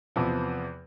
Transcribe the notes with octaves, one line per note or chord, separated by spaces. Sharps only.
E2 C3 F3 B3